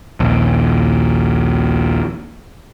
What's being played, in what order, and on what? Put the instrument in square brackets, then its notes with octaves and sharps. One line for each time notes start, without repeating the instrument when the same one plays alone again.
[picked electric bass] A#1 D#2